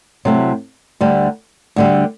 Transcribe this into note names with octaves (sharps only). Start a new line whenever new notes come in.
C3 F#3 A3 E4
D2 D3 G3
D2 D3 G3